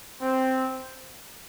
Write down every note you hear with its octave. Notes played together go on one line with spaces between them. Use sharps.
C4